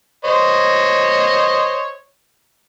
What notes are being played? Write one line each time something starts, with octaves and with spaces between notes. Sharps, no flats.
C5 C#5 D#5